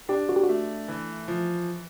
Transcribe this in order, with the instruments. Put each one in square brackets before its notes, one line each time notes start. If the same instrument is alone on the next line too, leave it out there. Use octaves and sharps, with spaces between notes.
[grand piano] D4 [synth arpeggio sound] G4
[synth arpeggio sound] F#4
G4
F#4
[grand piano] A3
E3
F3